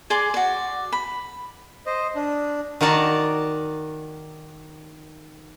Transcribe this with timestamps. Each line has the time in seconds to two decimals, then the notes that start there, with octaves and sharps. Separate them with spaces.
0.10 G#4 D5 C6 D6
0.34 F#4 D5
0.92 B5
1.86 C5 D#5
2.15 D4
2.81 D#3 F#4 A#4 D5 A5